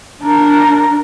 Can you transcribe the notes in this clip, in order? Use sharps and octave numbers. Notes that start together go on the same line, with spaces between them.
D4 A#4